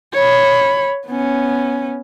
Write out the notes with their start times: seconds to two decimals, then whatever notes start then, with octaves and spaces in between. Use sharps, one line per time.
0.14 C#5 B5
1.06 B3 C#4